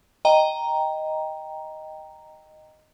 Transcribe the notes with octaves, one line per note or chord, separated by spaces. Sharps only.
D#5 G5 A#5